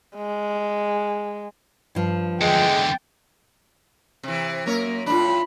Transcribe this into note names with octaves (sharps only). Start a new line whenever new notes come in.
G#3
G2 F3
E2 D3 G#3 G5
C3 E3
F#2 A#3 A#4 C#5
A2 D4 F4 B5